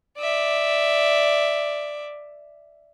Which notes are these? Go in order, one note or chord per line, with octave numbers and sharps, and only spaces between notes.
D5 E5